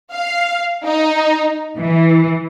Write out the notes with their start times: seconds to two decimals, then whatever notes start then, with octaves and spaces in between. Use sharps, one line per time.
0.13 F5
0.84 D#4
1.77 E3